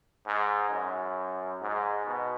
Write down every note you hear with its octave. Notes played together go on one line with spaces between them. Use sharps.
G#2
F#2
G#2
B2